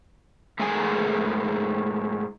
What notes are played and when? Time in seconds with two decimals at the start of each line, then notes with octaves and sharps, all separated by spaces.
0.60 G#2 A3 G#4 A#4 G#5